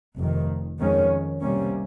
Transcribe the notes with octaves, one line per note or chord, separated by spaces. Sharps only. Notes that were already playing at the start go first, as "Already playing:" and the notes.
F1 F2 D#3
F2 D#3 G#3 C#4
C2 C3 G3 A#3 C#4